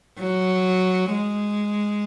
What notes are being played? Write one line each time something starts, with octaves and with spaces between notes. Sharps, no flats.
F#3
G#3